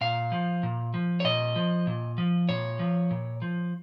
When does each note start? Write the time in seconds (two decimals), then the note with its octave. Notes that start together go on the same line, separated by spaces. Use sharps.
0.01 A#2 F5
0.32 F3
0.63 A#2
0.94 F3
1.20 C#5
1.24 A#2 D#5
1.56 F3
1.87 A#2
2.18 F3
2.49 A#2 C#5
2.79 F3
3.11 A#2
3.42 F3